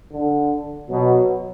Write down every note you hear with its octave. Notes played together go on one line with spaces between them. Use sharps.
D3
B2 F#3